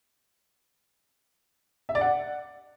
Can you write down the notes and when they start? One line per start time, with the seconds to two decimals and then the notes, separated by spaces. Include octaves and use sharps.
1.89 E5
1.95 D5
2.01 F#5